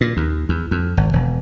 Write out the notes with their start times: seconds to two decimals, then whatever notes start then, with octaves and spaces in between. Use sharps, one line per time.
0.01 A#2
0.17 D#2
0.49 E2
0.71 F2
0.97 G#1
1.13 E1